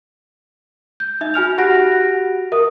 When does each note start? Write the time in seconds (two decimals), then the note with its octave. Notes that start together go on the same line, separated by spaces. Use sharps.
1.00 G6
1.21 D#4 E5
1.34 F#4 G#5 F6 F7
1.58 F#4 G4 F#5 F#6 A#6 D7
2.52 A#4 E5 D#6